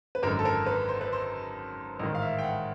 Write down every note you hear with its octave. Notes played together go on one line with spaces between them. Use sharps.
B4
G#1 F#2 D3 A#4
A4
A#4
B4
C5
B4
C5
A1 G#2 D#3 D#5
F5
E5
G5
F#5